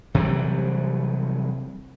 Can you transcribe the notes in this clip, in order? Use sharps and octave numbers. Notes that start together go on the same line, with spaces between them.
C3 E3 F#3 G3